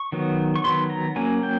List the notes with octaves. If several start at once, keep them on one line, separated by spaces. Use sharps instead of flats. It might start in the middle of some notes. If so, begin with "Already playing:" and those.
Already playing: C#6
D#3 F#3 B3
C#6
D#3 F#3 B3 C6
A#5
F#3 A#3 C#4 G#5
G5